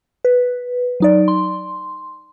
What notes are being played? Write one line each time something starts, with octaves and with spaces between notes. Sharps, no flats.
B4
F#3 D#4 D5
C6